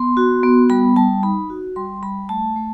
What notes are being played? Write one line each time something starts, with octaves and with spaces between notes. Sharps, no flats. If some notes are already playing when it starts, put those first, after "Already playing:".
Already playing: B3 C6
F#4
B3
G3 B5
G3 A5
D#4 B5
F#4
G3 C6
G3 B5
A3 A5
A3